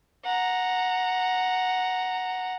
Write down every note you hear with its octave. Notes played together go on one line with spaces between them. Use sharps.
F#5 A#5